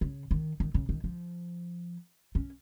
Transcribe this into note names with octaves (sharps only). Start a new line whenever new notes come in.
C#3
D#3
D#3
C#3
D#3
F3
C#4